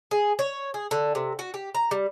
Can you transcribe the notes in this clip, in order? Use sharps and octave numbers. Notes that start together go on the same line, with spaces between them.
G#4
C#5
G#4
D3
C3
F#4
G4
A#5
G3